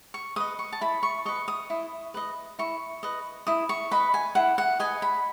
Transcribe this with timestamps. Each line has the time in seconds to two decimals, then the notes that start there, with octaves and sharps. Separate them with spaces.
0.14 C#6
0.36 B4 D#5 D#6
0.59 C#6
0.72 A5
0.81 E4 B5
1.03 C#6
1.25 B4 D#5 C#6
1.48 D#6
1.70 E4
2.14 B4 D#5
2.59 E4 C#6
3.03 B4 D#5
3.47 E4 D#6
3.69 C#6
3.91 B4 D#5 B5
4.14 G#5
4.35 E4 F#5
4.58 F#5
4.80 B4 D#5 G#5
5.02 B5